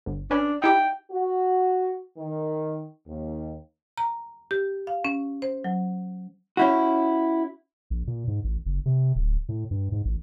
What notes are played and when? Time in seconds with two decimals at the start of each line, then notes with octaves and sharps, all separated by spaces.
0.06 G1
0.31 C#4 D4 B4
0.62 D#4 E4 G4 G5
1.11 F#4
2.17 D#3
3.06 D#2
3.98 A#5
4.51 G4
4.87 F5
5.05 C#4
5.42 C5
5.64 F#3
6.57 C#4 E4 F#4
7.90 A#1
8.07 A#2
8.27 G#2
8.44 A1
8.66 F#1
8.86 C3
9.15 D1
9.49 A2
9.71 G2
9.92 G#2
10.05 A1